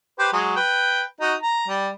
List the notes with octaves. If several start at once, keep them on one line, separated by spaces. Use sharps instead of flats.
G4 B4 C5
F#3 G#3
B4 G5
D#4 F#4
A#5
G3